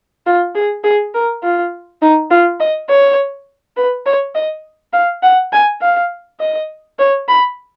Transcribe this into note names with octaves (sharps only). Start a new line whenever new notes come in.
F4
G#4
G#4
A#4
F4
D#4
F4
D#5
C#5
B4
C#5
D#5
F5
F#5
G#5
F5
D#5
C#5
B5